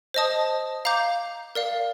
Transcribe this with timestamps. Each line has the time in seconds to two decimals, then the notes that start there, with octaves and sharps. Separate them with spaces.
0.14 C5 D#5 A5 D#6
0.85 F5 A#5 D6 G6
1.55 A#4 D5 F5